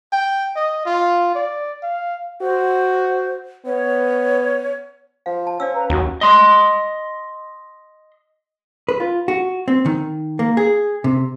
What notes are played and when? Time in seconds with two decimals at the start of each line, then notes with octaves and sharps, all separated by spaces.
0.13 G5
0.56 D#5
0.85 F4
1.35 D5
1.82 F5
2.42 F#4 C5
3.66 B3 C#5
5.26 F3 F5
5.47 A5
5.60 C#4 C5 D5 F5 E6
5.74 B4 A#5
5.90 D#2 F#3 C#4 F#4
6.21 D#5 C6
8.89 B4
9.00 F4
9.28 F#4
9.68 C4
9.86 D#3
10.39 A#3
10.57 G#4
11.04 C3